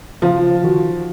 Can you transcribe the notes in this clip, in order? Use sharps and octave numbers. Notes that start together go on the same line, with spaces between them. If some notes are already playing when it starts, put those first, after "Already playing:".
C#3 F3 F5
D#3 F#4